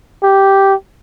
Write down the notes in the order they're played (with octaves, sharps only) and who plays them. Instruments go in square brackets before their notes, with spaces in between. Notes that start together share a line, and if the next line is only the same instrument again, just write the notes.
[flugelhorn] G4